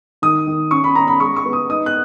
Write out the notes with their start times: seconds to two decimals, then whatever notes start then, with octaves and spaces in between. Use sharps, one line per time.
0.22 D#3 D#6
0.47 D#3
0.71 C#4 C#6
0.84 B5
0.95 C#4 A#5
1.08 B5
1.20 G#3 C#6
1.36 C#6
1.46 B3
1.53 D#6
1.70 D#4 D#6
1.86 F#6